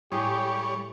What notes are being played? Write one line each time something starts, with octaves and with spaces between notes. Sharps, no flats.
A2 G3 G4 G#4 C#5